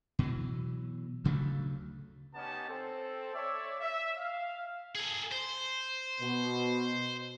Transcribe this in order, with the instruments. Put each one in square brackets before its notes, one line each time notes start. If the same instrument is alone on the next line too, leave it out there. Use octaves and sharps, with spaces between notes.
[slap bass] B2 E3 F#3
D2 C#3 F#3 A3
[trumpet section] B3 C#4 D#4 G4 F#5 A5
C4 A4
C#5 D5 E5
E5
F5
[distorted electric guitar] G#4 A4
C5
[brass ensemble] B2